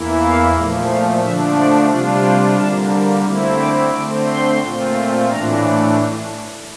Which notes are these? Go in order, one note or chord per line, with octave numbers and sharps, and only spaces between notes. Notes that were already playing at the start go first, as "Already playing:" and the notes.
Already playing: E2 E3 A#3 E4
F5
A#2 F3 A3
F5
D3 F3 A3 D4 E5
D5
C3 G3 D4 F4 D5
C5
D3 G3 A#3 A5
D3 A3 C4 E4
D6
D3 A3 C4 D6
C6
A#2 A3 C4 F4
A2 E3 A3 D4 A#5